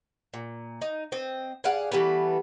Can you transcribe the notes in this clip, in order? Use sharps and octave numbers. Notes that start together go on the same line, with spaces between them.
A#2
D#4
C4 D#5
G#4 D5 F5 F#5
E3 G3 A3 B3